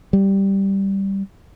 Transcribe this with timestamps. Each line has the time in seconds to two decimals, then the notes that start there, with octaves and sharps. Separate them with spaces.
0.13 G3